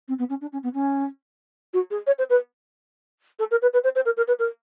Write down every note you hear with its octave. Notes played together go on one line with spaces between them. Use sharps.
C4
B3
C#4
D4
C#4
B3
C#4
F#4
G#4
C#5
C5
B4
A4
A#4
B4
B4
C5
C5
A#4
A#4
B4
A#4